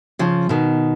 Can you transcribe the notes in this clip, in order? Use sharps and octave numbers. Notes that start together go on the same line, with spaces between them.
C#3 F3
B2 D#3